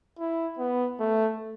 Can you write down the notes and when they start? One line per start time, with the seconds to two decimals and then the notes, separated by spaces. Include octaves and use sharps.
0.19 E4
0.59 B3
1.00 A3